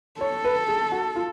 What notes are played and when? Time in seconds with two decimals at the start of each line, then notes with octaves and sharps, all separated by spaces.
0.21 A4 C#5
0.45 B4
0.68 G#4
0.92 F#4
1.16 F4